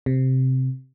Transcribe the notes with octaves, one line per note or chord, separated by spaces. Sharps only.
C3